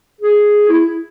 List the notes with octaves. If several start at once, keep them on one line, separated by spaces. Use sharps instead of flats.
G#4
E4